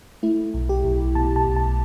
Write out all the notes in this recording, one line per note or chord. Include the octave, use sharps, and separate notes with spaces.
A3 E4
B1
G4
B1
B2 A5
A5
B1
A5